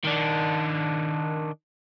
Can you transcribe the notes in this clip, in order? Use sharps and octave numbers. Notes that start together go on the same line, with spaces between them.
D#3 D4